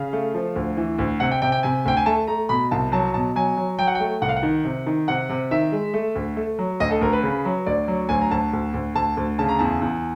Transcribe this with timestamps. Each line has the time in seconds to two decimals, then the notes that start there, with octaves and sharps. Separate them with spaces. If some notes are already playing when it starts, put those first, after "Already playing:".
Already playing: C#3 F5
0.13 A3
0.34 F3
0.56 D2
0.77 E3
0.98 D2
1.20 C3 F#5
1.31 G5
1.42 C3 G5
1.52 G5
1.63 C3 G#5
1.85 D2 G5
1.97 G#5
2.06 A3 A5
2.27 A3 A#5
2.49 B2 B5
2.71 C2 A5
2.92 F#3 A5
3.14 B2 A5
3.36 F#3 G#5
3.57 F#3
3.79 F#3 G5
3.87 F#5
3.95 A3 G5
4.21 C2 F#5
4.29 F5
4.36 F#5
4.43 D#3
4.65 C3
4.86 D#3
5.08 C3 F#5
5.29 C3
5.51 D#3 E5
5.72 G#3
5.94 A3
6.15 D2
6.37 A3
6.59 F#3
6.80 D2 D#5
6.91 A4
7.01 D2 A#4
7.13 B4
7.23 C#3
7.45 F#3
7.66 D2 D5
7.88 F#3
8.09 D2 G#5
8.21 A#5
8.31 D2 A5
8.53 D2
8.74 D2
8.95 D2 A5
9.17 D2
9.39 C#3 A5
9.49 A#5
9.59 E2 A5
9.81 E2